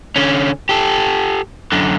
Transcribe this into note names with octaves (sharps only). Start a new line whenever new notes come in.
D3 C#4
G4 A4
F#2 D3